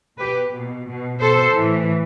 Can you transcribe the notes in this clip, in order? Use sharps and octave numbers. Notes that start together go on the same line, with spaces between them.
B2 G4 B4
B2
B2
B2 A4 C5
A2 E3